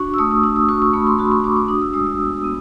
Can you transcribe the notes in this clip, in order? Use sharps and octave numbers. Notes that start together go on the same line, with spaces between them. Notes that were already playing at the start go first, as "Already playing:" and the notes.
Already playing: D4 F#4 C#6
E6
A3 D#6
D#6
D4 E6
D#6
F#4 C#6
C#6
A3 B5
C6
F#4 B5
C#6
F#4 D6
D6
D4 D#6
E6
G#3 D#6
E6
B3
B3